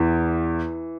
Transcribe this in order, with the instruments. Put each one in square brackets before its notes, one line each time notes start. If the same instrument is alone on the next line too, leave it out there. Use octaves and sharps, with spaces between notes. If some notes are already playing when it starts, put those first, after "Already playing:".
Already playing: [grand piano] E2 [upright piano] E3